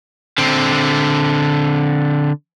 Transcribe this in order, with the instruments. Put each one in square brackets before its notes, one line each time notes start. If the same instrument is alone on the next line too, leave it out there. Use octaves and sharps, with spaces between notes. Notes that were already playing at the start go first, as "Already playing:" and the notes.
[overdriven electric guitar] D3 C4